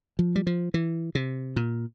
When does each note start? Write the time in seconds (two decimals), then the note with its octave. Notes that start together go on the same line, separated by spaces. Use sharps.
0.19 F3
0.36 G3
0.47 F3
0.74 E3
1.15 C3
1.56 A#2